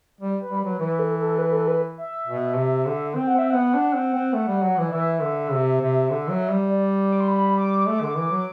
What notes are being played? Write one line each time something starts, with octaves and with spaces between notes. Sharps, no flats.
G3
B4
G3
F#3 B4
E3 B4
A4
A4
B4
A4
B4
E5
B2
C3
D3
C4 G5
F#5
C4 E5
B3 F#5
D4
C4
C4
A3
G3
F#3
E3
D5
E3 E5
D3
C3
C3
D3
F#3
G3
D5
D6
C6
B5
D6
A3 D6
D3
E3
F#3